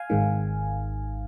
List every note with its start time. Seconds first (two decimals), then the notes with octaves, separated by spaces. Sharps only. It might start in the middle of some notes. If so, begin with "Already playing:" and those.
Already playing: F5 G#5
0.10 G#1 G#2 D#3